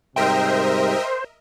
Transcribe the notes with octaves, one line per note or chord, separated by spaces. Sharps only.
G#2 C3 G3 A#4 C5 D#5 E5 G5